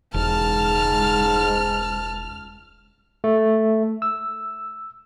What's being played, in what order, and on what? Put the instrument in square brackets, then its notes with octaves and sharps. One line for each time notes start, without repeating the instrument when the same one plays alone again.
[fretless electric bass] E1 [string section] C#2 F6 [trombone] G#2 [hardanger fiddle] A5
[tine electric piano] A3
E6